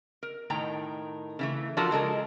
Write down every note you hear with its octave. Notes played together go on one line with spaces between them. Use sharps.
A#4
A2 D#3 G5 A#5
C#3 E3 A3
F3 D4 F4 F#4 A4 A#4
C#3 G#3 A4 A#4